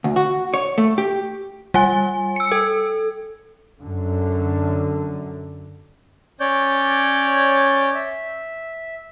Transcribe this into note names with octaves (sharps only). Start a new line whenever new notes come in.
D2
F#4
C#5
A3
G4
G3 G#5
E6 C#7
A4
F#2 D3
C#4 C#5 D5 G6
E5